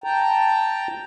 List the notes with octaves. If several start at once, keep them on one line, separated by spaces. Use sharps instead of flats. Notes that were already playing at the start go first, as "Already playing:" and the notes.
G5 A5 A#5